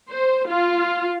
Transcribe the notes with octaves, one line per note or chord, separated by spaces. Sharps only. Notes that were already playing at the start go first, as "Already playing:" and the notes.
C5
F4